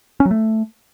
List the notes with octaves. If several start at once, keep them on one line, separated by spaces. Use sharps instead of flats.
C#4
F#3
A3